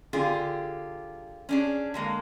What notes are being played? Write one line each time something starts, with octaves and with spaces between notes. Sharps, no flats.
D3 F4 G4 G#4
C#4 D4 G#4
D3 G#3 A#3